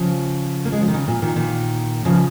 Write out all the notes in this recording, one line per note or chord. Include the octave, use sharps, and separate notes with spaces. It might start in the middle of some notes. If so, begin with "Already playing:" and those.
Already playing: C#3 F3
A#3
G#3
F3
D#3
C#3
A#2
A#2 D#3
A#2 D#3
C#3 F3